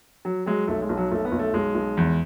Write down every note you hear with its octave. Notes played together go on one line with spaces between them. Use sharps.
F#3
F#3 G#3
B1 A3
G#3
B1
F#3
B1 A3
B3
B1
A3
B1 G#3
B1
E2